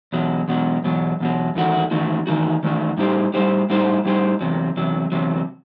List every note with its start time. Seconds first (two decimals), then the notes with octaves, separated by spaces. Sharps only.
0.13 E2 B2 F#3
0.48 E2 B2 F#3
0.84 E2 B2 F#3
1.20 E2 B2 F#3
1.55 E2 D#3 A3 D#4 F#4
1.91 E2 D#3 A3 D#4 F#4
2.27 E2 D#3 A3 D#4 F#4
2.63 E2 D#3 A3 D#4 F#4
2.98 A2 G3 D#4 G4 C5
3.34 A2 G3 D#4 G4 C5
3.70 A2 G3 D#4 G4 C5
4.05 A2 G3 D#4 G4 C5
4.41 E2 C3 F#3
4.77 E2 C3 F#3
5.12 E2 C3 F#3